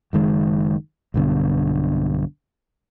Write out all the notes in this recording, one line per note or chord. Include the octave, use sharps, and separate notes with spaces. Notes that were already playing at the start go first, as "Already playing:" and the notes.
F#1 D#3 G#3
B1 G2 D3 B3